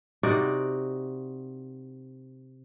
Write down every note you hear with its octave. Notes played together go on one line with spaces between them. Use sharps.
C3 D#4 F#4 D5